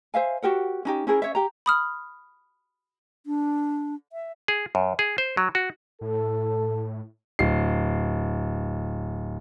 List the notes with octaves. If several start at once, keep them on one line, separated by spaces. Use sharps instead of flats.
C5 E5 F5 G#5
F#4 G4 A#4 F#5
C#4 D#4 G4
C#4 E4 G#4 A#4
C#4 C#5 E5
G4 A#5
B5 D#6 F6
D4
E5
G#4
F#2
G#4
C5
F#3
F#4
A2 A4
D1 C7